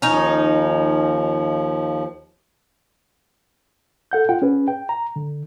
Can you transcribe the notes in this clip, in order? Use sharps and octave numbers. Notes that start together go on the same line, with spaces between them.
D#2 F3 C#4 D#4
A4 F#5 G6
F4 F#5 G5
C#4 G#4 B4
G5
A#5
D3